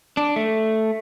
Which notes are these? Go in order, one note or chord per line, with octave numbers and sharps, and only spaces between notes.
D4
A3